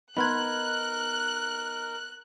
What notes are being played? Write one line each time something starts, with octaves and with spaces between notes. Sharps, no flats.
B3 D#4 A#4 B5 C6 F#6 G#6